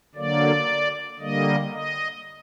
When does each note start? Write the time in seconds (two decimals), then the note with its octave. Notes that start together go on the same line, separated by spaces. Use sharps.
0.15 D3 F#3 A#3 D5
1.19 D3 G3 A#3 D#5
1.71 D#5